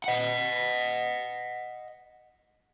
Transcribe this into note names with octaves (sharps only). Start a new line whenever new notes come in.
D#5 F#5